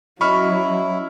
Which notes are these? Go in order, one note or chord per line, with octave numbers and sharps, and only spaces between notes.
F#3 C#4 E4 C#5 D#5 B5 C#6 F6